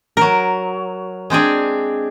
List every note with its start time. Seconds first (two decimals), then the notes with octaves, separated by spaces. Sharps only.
0.17 F#3 A#4
1.30 G#3 C4 D4 G#4